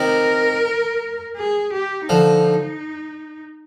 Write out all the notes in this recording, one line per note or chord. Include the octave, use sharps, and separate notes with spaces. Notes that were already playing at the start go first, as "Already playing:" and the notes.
Already playing: C3 D#3 A#4
G#4
G4
D3 F3 D#4